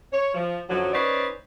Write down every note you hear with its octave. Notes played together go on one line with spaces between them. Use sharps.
C#5
F3
F#2 D3 F3 F#3
C#4 D#4 B4 C5 D5